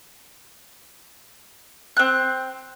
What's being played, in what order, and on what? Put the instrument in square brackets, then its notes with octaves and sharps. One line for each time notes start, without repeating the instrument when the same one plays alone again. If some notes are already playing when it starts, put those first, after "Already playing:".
[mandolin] C4 F#6